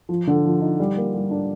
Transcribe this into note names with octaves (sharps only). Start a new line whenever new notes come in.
F3
D3
F3
D#4
G3
A#3
G3
D4